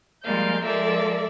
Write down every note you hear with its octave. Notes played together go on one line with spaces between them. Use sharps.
F3 G3 G#3 A#3 F5 G6
F3 G#3 A4 A#4 D5 E5